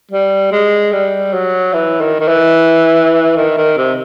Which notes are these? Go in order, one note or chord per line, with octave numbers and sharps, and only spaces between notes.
G3
G#3
G3
F#3
E3
D#3
D#3
E3
D#3
D#3
C3